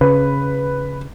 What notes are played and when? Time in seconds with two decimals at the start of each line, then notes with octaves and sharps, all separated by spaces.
0.01 C#3 B4